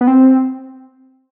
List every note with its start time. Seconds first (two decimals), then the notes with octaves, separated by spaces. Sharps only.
0.01 B3
0.07 C4